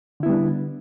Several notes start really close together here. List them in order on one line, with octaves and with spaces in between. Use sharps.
D3 E4 B3 G3 D4